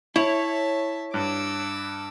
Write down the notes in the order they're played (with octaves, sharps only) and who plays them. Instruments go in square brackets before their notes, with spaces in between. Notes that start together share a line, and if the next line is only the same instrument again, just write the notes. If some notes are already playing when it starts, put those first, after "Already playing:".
[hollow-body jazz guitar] E4 [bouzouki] C#5 [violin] E5 A5
[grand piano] G2 [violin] D6 E6